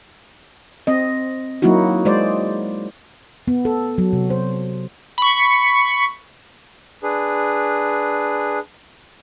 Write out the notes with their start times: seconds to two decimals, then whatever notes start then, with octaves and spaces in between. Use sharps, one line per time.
0.87 C4 D#5
1.62 F#3 A#3 D#4 E4 F#4
2.05 G#3 C5 D5
3.48 B3
3.65 A4
3.98 F#3
4.13 C3
4.30 C5
5.18 B5 C#6
7.03 D4 G#4 B4